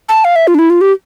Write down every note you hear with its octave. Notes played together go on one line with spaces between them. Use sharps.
A5
F5
E5
F4
D4
E4
F4
G4